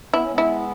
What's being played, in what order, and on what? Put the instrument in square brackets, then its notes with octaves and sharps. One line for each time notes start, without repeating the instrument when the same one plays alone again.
[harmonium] B3 [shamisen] E4
[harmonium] C#4
G#3 B3
[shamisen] E4